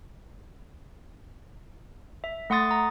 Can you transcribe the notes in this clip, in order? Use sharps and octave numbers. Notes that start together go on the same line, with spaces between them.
E5
A3 F#5 C6 D#6 A6
A#5